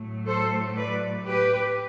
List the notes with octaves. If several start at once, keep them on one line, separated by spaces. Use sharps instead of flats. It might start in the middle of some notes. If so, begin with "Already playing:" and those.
Already playing: A2 F#3 A3
A4 C5
B4 D5
G4 B4